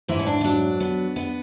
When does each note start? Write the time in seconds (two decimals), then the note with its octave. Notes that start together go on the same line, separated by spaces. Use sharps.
0.08 G#2 E3 E4
0.19 C#4
0.27 D4
0.41 E4
0.44 F#3 D4
0.80 B3
1.16 B3